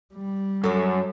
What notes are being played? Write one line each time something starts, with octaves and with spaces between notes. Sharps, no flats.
G3
F#2 A4 C#5